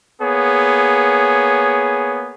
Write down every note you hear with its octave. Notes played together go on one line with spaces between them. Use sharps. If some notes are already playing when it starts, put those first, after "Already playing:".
A#3 B3 G#4 C#5